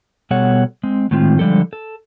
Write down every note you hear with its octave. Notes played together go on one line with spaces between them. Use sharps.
B2 G3 B3 A4 C#5 F#5
G#3 C4
A2 D#3 G#3 C4 F4
D3 F3 G3 G#3 A4
A4